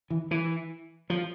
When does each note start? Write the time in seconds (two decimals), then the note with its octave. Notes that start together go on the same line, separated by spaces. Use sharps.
0.10 E3
0.31 E3
1.10 F3